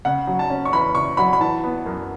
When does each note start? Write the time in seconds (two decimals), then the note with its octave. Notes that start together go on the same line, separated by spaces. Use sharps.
0.05 C#3 F#5
0.27 F#3
0.39 A5
0.50 C#4
0.65 C#6
0.73 E2 B5
0.95 C#3 C#6
1.17 F#3 B5
1.33 B5
1.40 E3 A5
1.64 B3
1.86 F#2